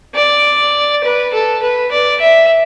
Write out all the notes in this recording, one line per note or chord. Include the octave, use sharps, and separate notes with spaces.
D5
B4
A4
B4
D5
E5